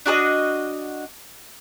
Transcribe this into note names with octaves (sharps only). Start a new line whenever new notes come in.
D4 F#4 A4 D#5